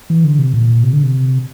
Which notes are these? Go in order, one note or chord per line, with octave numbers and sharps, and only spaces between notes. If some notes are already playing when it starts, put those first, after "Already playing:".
E3
D3
C3
A#2
C3
D3
C3